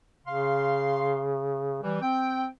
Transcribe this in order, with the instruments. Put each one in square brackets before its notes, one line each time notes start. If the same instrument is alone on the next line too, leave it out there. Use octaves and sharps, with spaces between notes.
[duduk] C#3 [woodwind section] F5 C6
[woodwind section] E3 [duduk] G3
[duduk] C4 [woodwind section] G5